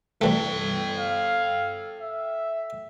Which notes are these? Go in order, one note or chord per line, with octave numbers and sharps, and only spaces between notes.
C2 E3 A3 A4 G5
F5
E5